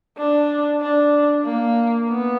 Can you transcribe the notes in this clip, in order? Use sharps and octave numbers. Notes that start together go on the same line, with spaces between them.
D4
D4
A#3
B3